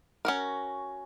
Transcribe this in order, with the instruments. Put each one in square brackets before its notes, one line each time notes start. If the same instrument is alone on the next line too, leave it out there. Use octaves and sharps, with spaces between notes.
[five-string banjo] C#4 F#4 A#4